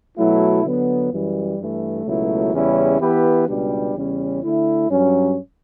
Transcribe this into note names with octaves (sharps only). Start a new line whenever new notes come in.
B2 F#3 A3 E4
D3 F#3 B3
F#2 E3 G3
G2 E3 A3
C#2 B2 F#3 A3 E4
E2 C#3 G3 C#4 E4
E3 B3 E4 G4 B4
C#2 B2 G3 D4 G4
E2 C#3 G3 C#4
D3 A3 E4
G2 F#3 C#4